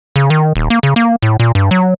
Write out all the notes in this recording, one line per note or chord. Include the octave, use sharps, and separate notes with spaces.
C#3
D#3
D#1
A#3
C#3
A#3
A2
A#2
G2
F#3